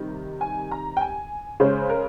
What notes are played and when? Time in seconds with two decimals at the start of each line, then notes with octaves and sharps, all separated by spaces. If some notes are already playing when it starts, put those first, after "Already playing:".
Already playing: C3 D#3 G3
0.41 G#5
0.71 A#5
0.97 G5
1.01 G#5
1.60 C#3 G#3 C#4 C5
1.90 A#4